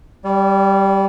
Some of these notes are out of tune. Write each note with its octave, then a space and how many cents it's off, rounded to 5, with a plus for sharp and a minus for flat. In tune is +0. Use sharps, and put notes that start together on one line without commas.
G3 +0 D5 -40